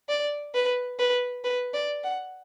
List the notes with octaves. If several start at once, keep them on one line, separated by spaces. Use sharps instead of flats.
D5
B4
B4
B4
D5
F#5